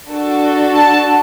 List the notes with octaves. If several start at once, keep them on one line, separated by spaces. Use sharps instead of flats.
D4 F#4 A4
A5